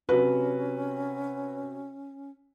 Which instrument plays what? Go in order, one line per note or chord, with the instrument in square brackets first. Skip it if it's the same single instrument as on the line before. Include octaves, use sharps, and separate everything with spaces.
[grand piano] C3 F#3 F#4 [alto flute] C#4 [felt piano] B4